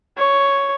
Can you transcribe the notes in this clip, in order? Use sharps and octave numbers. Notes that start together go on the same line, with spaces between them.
C#5